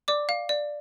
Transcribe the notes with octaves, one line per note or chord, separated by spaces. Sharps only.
D5 D6
F5
D5